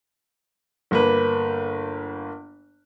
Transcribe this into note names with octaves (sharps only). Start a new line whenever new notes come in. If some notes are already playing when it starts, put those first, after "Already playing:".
G1 A#3 B4